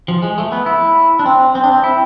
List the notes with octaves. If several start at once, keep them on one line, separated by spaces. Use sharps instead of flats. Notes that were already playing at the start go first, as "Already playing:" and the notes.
F3
G#3
A3
B3
E4
D4
C4
C4
D4
C4
E4